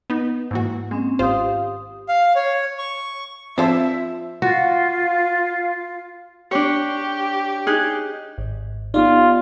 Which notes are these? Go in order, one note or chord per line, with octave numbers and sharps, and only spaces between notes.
B3 D#4
G#2 E3 A#3 F#4
G#3 C4 C#4
G#1 F4 G4 C5 F5 D#6
F5
C#5
C#6
F3 C4 D4 A4 C5 E5
F4 F#4 F5
D4 G4 C#5
D#4 G#4 F#6
G#1
B3 D#4 F4 G4 D5